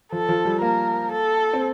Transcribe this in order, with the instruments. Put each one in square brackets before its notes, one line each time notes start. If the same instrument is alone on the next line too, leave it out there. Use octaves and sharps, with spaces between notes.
[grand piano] F3 [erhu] A4
[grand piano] F3
G3
[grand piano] A#3 [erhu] A#4
[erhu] A4
[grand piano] C4